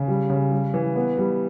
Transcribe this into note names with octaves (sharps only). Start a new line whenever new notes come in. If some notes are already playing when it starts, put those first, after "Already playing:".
Already playing: C#3
G3
C#3
G3
E3
B3
G3